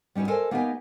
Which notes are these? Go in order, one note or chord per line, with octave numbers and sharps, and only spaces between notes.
G3 C#4 D#4 F#4 B4
A4 A#4 C5 D#5 G#5
A#3 B3 D#4 G4 D#5 G#5